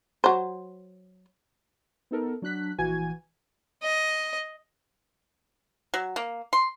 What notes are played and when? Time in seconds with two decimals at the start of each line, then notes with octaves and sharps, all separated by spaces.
0.24 F#3 C5
2.11 B3 D#4 A4 A#4
2.42 F#3 D4 F#6 B6
2.78 A#1 E3 F#4 G#5 G#6
3.83 D#5
5.94 F#3
6.16 A#3
6.53 C6